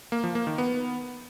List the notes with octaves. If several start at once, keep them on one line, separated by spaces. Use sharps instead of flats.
A#3
F3
A#3
D#3
B3